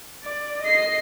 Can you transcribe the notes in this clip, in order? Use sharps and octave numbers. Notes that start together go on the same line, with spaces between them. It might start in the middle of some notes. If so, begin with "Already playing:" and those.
D5
D#5 C7